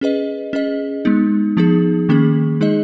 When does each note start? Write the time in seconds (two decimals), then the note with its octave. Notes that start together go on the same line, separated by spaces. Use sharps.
0.01 C#4 G#4 B4 D#5
0.53 C#4 G#4 D#5
1.05 G#3 B3 D#4
1.57 F3 B3 D#4 G#4
2.09 D#3 A#3 C#4 G#4
2.61 G#3 D#4 G#4 D#5